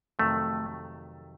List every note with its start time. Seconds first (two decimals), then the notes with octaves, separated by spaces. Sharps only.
0.19 F2 C3 D#3 F#3 A3